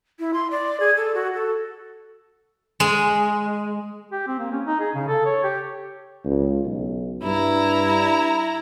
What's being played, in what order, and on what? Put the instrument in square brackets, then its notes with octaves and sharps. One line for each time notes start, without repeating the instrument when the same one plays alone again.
[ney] E4
C6
D5
G#4
A4
F#4
A4
[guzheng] G#3
[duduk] G4
C4
A#3
C#4
D#4
G#4
C#3
A4
C#5
G4
[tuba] C#2
B1
[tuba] G2 [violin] E4 A#5